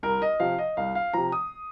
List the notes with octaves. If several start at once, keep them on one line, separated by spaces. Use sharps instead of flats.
C2 A#4
D#5
C3 F3 F5
D#5
C2 F5
F5
C3 F3 A#5
D#6